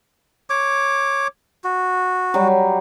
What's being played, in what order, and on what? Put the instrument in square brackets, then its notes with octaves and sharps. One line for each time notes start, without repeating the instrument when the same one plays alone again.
[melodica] C#5 D6
F#4
[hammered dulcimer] F#3 G3